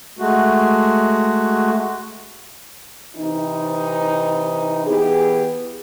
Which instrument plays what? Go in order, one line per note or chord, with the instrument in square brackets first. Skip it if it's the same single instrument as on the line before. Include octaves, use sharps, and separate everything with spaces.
[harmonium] G#3 A3 F#4
[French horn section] C3 E3 D#4
E3 B3 G4 G#4